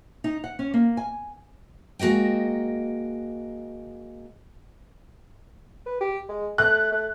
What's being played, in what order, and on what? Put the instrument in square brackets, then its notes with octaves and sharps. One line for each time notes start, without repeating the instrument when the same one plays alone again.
[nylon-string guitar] D#4
F#5
C#4
A#3
G#5
[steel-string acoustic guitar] G#3 A#3 F#4 D#5 G5
[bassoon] B4
G4
G#3
[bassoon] A3 [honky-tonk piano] F#6
[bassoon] A3